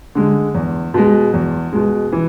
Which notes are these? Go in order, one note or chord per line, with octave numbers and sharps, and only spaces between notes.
D3 G#3
E2
B2 G#3
E2
B2 G#3
E3